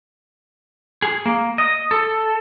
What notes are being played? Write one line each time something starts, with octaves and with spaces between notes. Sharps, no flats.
G#4
A#3
D#5
A4